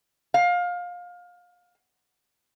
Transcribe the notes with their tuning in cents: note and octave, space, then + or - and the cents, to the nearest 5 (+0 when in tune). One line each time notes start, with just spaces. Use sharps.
F5 +25